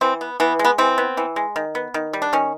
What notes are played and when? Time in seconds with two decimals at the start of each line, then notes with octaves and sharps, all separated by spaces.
0.01 E3 C4
0.21 B3
0.40 E3 B3
0.59 G#3
0.65 B3
0.78 E3 C4
0.98 B3
1.17 E3
1.36 G#3
1.56 D#3
1.75 B3
1.94 D#3
2.13 G3
2.22 D4
2.33 D#3 C#4